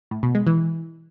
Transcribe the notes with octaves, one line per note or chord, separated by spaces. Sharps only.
A2
B2
G#3
E3